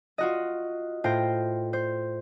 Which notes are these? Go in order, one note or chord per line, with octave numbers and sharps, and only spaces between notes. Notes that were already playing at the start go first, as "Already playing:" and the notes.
F4 F#4 D#5
A2 F4 C5 G5 A#6
C5